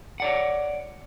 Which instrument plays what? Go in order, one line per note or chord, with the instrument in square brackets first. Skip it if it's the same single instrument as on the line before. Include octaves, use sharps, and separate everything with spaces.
[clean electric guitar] C#5 D5 F#5